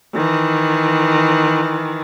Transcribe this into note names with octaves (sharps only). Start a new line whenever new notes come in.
D#3 E3